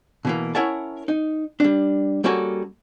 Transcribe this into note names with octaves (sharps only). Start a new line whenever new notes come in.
B2 E3 A#3
C#4 E4 A#4 C#5 F#5 A5
D#4
G3 D4
G3 A#3 C#4 F#4 A4